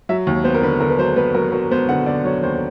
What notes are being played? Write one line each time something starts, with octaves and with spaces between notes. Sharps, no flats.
F#3 E5
D#2
B3 C5
A#4
D3 B4
D3 A#4
B4
F#3 C5
B3 B4
F#3 A#4
F#3 A#4
B3 C5
D3 F#5
D3 D5
F#3 C#5
D#2 C5